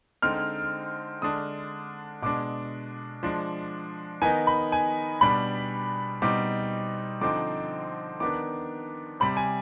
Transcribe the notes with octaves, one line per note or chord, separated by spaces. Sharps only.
D3 G#3 C4 D#4 F6
D3 G#3 D4 D#6
B2 G#3 D4 D6
F3 G#3 D4
D#3 B3 D#4 G#5
B5
G#5
B2 G3 D4 B5
B2 G3 C4 D#4 D6
D3 F3 C4 D#4 D6
D#3 B3 D4 D6
C3 G3 C4 B5
G#5